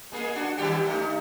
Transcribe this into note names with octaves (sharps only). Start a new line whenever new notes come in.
G#3 A#3 G#4
D4 F#4
D#3 G3 G4
A3 D#4